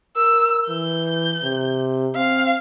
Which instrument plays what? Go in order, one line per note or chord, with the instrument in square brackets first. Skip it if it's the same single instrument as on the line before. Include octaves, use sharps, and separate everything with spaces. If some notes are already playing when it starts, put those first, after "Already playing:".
[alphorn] A#4 [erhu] E6
[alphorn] E3 [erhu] G6
[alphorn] C3
[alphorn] C4 [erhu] F5